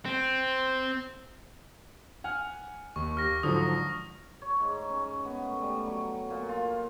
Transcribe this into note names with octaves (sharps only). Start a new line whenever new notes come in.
C4
F#5 G#5 F6
D#2 C#6
G4 F6 A#6
G#2 D3 F3 F#3 D#6
C#5
G#2
C#4
B3
A3
G3
F#3
A#2
F4